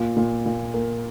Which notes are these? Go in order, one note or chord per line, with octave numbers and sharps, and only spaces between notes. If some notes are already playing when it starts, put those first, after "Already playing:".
Already playing: A#2
A#2
A#2
A#3